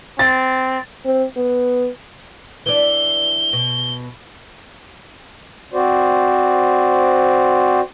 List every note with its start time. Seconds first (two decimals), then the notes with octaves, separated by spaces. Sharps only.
0.19 C4 A6
1.05 C4
1.37 B3
2.66 E3 D4 G7
3.53 B2
5.73 C4 F#4 C5 D5